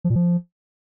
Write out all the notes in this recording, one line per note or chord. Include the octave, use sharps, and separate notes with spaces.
F3
A#2
F3